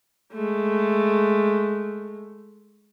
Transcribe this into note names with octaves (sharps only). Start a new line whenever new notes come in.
G#3 A3